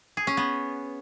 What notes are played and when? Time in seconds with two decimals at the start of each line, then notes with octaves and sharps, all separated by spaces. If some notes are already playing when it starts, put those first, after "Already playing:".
0.17 G#4
0.27 C#4
0.37 B3